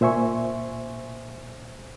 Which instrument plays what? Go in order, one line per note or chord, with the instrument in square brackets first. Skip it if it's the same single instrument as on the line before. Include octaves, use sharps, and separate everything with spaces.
[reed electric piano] A#2 C5 E5 G#5 C#6